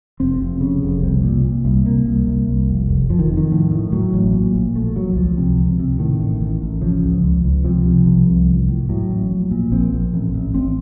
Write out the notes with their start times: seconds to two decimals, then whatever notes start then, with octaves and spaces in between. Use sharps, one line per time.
0.20 F1 C4
0.40 F1
0.61 C#3
0.83 F1
1.03 C2 C4
1.23 A#2
1.44 A#2
1.65 C2
1.86 C2 A#3
2.06 C2
2.27 C2
2.48 C2
2.68 F1
2.89 F1
3.10 F1 F3
3.19 D#3
3.30 F2
3.37 D#3
3.52 A2
3.71 A2
3.92 A2 F#3
4.13 A1
4.33 A#2
4.55 A#1
4.75 A#1 A3
4.96 A#1 F#3
5.16 C#2 F3
5.37 C3
5.58 C#2
5.79 C3
5.99 A2 D#3
6.20 A1
6.40 A1
6.62 A1
6.82 C#3 F3
7.03 C#2
7.23 C#2
7.44 C#2
7.64 C3 F3
7.85 C3
8.06 C2
8.27 C2
8.48 A1
8.69 A2
8.89 A2 F#3
9.09 A1
9.31 A#1
9.51 A#2
9.72 A#1 C4
9.93 A#1
10.13 A1
10.34 A1
10.54 A1 C4